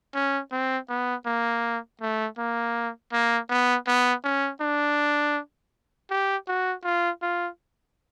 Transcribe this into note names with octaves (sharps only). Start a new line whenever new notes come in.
C#4
C4
B3
A#3
A3
A#3
A#3
B3
B3
C#4
D4
G4
F#4
F4
F4